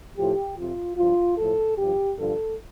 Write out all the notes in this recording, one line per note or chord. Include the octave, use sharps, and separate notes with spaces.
A2 F3 G4
F2 C3 F3 F4
G2 F3 F4
A2 F3 A4
G2 F3 G4
G2 D3 F3 A4